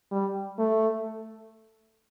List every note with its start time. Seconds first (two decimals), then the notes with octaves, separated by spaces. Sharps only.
0.12 G3
0.59 A3